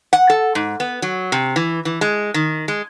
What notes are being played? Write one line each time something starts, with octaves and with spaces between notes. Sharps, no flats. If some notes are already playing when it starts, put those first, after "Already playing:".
F#5
A4
G#2
B3
F#3
C3
E3
E3
G#3
D#3
G#3